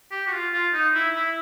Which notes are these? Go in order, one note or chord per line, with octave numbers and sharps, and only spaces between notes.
G4
F#4
F4
F4
D#4
E4
E4